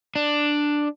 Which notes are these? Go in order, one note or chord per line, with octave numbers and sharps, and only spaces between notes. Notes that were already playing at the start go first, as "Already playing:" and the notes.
D4